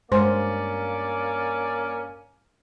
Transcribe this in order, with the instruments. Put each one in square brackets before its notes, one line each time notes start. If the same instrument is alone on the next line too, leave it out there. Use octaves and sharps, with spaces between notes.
[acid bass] G2 [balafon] G#3 C5 C6 [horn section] A#3 C#4 D5